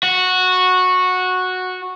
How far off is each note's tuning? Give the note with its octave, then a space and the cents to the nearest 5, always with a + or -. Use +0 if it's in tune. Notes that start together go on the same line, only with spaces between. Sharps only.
F#4 -10